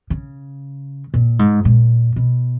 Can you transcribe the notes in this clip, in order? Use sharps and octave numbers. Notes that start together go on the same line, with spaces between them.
C#3
A#2
G#2
A#2
B2